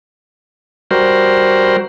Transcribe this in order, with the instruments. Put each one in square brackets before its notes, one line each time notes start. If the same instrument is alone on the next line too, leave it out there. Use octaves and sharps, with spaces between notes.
[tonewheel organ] G3 F#4 A#4 C5